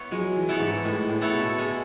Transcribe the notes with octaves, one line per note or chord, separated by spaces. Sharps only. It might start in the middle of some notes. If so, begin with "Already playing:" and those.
Already playing: B3 E4 C#5
F#3 G#3
E3
B3 E4 A4 C#5
G#2
A2 G#3
A2
B3 E4 A4 C#5
B2
G#3